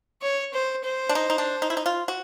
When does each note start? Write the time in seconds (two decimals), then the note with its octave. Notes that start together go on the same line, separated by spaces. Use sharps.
0.22 C#5
0.53 C5
0.84 C5
1.09 D4
1.15 D#4
1.30 D#4
1.38 D4
1.62 D#4
1.70 E4
1.77 D#4
1.86 F4
2.08 F#4